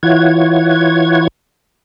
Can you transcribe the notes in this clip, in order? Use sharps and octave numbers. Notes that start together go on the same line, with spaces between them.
E3 E4 F4 C#5 F#5 G#6